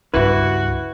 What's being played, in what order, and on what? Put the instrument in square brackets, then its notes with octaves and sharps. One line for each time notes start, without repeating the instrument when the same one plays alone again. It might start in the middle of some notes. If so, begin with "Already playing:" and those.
[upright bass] C#2 G2 [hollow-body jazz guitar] E4 B4 [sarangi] F#4